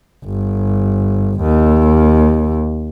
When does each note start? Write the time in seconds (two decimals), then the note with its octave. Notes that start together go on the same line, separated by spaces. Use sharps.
0.25 G1
1.41 D#2